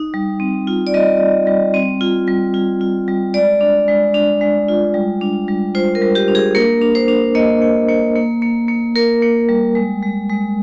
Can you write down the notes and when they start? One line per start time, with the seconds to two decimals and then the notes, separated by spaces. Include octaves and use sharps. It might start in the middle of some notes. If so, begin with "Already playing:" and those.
Already playing: D#4
0.14 G3
0.40 C4
0.67 F4
0.87 D5
0.94 G3 D#5
1.21 G3
1.47 G3
1.74 C4
2.01 F4
2.27 G3
2.54 F4
2.81 F4
3.08 G3
3.34 G#3 D5
3.61 D4
3.88 G#3
4.14 D4
4.41 G#3
4.68 F4
4.94 G3
5.21 D4
5.48 G3
5.75 F4 C5
5.95 A#4
6.02 G3
6.15 G4
6.28 D4
6.35 G#4
6.55 A#3 A#4
6.82 D4
6.95 C5
7.08 D4
7.35 A#3 D#5
7.62 A#3
7.89 A#3
8.16 A#3
8.42 A#3
8.68 A#3
8.96 A#3 A#4
9.22 A#3
9.49 G3
9.75 G#3
10.02 G#3
10.29 G#3